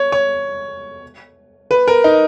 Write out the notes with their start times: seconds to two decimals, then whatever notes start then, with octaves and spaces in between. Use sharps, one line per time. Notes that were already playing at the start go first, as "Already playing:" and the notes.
Already playing: C#5
0.12 C#5
1.71 B4
1.88 A#4
2.04 D#4